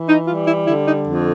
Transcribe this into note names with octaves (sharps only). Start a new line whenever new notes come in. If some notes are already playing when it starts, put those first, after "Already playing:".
Already playing: E3
D#4
G3 F4
E4
D3 E4
D#4
F2